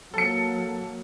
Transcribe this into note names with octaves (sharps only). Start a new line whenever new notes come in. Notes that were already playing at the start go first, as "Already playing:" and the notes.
F#3 A#3 A4 C#7